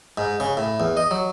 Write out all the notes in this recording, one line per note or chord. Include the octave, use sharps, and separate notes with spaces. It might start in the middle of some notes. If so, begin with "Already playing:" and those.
G#2
C#3
A2
E2
D#5
F#3